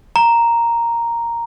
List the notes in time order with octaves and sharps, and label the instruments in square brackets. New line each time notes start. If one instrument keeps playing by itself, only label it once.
[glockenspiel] A#5